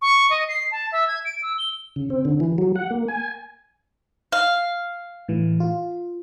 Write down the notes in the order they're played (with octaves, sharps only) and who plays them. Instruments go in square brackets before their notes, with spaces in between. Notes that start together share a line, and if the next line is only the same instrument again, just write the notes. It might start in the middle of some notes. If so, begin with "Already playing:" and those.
[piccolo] C#6
D#5
C7
A5
E5
G#6
D7
E6
G7
[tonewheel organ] C#3
C4
D3
E3
F#3
F#5
A#3
G#5
[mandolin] F5
[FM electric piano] A2 E3
F4